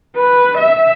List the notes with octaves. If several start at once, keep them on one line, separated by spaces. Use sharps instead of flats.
B4
E5